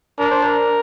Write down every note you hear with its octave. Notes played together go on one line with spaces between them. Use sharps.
D4 A#4
C5
A#4